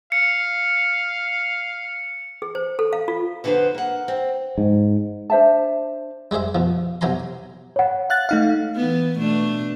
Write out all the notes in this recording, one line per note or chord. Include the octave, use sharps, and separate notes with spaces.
F5 C#7
G#4
C5
A4
F5
F4
F2 D3 B3 F#4 B4 C5
A#3 F#5
C4
G#2
D4 C5 E5 A5
G3 G#3 G#4 C5 E5
B2 F3
B1 C3 F#3 G#5 A#5 C6
C#5 F#5
F5 F#6 A6
A3 D#4 F5
E3 B3
B2 A3 D4